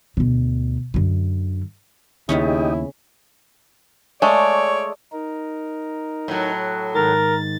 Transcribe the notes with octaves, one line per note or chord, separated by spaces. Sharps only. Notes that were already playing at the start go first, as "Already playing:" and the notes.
D2 B2
F#2 D3
D#2 C#3 B3 C#4 D#4 E4 G4 D#5
G#3 A3 C#5 D5
D#4 A#4
A2 F#3
G#2 D#3 A#4 A6